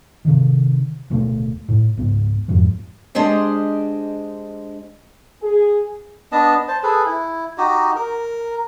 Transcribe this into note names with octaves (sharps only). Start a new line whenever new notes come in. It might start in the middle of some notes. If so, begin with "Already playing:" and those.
C3 D#3
D1 B2 A3
A2
C#2 G#2 B3
D1 F2 G#2 F3
G#3 D4 G4 C5 D#5
G#4
B3 D4 D#5 A5
C5 A5
G#4 A4 B4
E4
D#4 F#4 G4 D#5
A#4